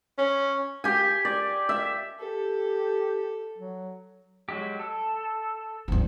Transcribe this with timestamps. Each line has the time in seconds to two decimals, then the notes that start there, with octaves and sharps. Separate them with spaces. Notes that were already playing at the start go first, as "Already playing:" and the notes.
0.18 C#4
0.84 G4 G#5
1.25 D5
1.69 E5
2.19 G4 A4
3.58 F#3
4.49 F#3 G#3 G4
4.79 A4
5.88 D2 G2